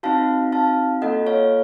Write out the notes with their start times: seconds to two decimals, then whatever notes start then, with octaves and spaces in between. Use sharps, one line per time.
0.03 C4 D#4 F#4 F5 A5
0.52 F5 A5
1.02 A#3 F4 A4 D#5 F#5
1.27 C#5 F5